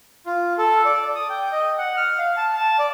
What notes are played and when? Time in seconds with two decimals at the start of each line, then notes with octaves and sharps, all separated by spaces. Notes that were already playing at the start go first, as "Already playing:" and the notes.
0.26 F4
0.58 A4
0.85 D5
1.16 D#6
1.30 G5
1.52 D#5
1.78 F#5
1.97 F6
2.19 F5
2.37 A5
2.56 A5
2.79 D5